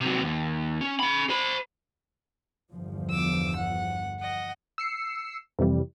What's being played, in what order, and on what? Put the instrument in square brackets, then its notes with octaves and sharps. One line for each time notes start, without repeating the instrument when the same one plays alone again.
[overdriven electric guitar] C3 F#3
D#2
C#4
C#4 B5
C5 B5
[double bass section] G1 E2 F3
[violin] D6 E6
F#5
D#5 F#5
[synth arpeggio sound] E6 C7 C#7
F2 C3 E3 G3